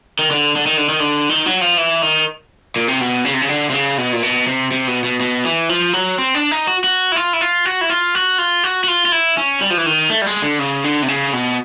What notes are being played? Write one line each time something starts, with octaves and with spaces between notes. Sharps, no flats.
D#3
D3
D3
D#3
D3
D#3
D3
D#3
F#3
F3
E3
D#3
A#2
C3
B2
C#3
C3
C#3
D3
C3
C#3
B2
A#2
B2
C3
C3
B2
B2
B2
E3
F3
F#3
C4
D4
D#4
F#4
F#4
E4
F4
E4
F4
F#4
E4
F4
F#4
F4
F#4
F#4
F4
F4
E4
C#4
G3
F3
E3
D#3
A3
G3
G#3
D3
C#3
D3
C3
C#3
B2